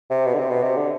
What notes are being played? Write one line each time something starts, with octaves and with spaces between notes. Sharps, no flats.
C3
B2
D3
C3
B2
C3
D3